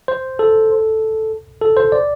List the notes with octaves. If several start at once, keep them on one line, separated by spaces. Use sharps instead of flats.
C5
A4
A4
C5
D5